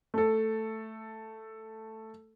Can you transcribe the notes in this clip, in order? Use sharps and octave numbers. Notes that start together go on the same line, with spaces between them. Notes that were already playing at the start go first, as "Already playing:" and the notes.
A3 A4